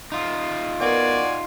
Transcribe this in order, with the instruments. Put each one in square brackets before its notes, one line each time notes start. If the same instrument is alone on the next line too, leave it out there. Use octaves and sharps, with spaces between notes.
[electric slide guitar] D#4 F4
[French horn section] B3 A#4 [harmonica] F#4 D5 G#5